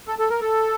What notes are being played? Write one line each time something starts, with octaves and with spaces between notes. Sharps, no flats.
A4
A4
A#4
A4